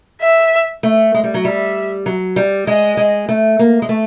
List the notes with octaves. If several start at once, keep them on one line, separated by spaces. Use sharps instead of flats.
E5
A3
G#3
G3
F#3
G3 E5
F#3
G3
G#3 D#5
G#3
A3
A#3
G#3
A3